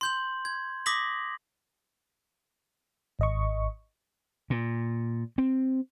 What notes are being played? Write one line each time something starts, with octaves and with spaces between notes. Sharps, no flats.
C6 G6 F#7
G#6
D6 D#6 A#6 B6 F#7
G#1 D#5 C#6
A#2
C4